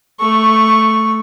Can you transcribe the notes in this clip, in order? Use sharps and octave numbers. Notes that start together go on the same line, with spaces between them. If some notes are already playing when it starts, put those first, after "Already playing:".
A3 C#6